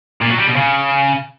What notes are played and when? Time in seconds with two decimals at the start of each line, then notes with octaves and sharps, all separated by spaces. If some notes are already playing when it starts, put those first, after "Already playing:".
0.22 A#2
0.30 F#3
0.39 G3
0.48 B2
0.56 C#3